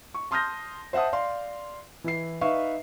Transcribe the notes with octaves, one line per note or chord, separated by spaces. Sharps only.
C#6
A5 C6 D#6 F6 G6 A#6
C5 E5 F#5 A5 D#6
D5 F5 C6
E3 E4 C7
D#4 B4 E5 F5 C#6